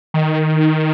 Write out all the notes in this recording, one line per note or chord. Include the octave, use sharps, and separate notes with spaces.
D#3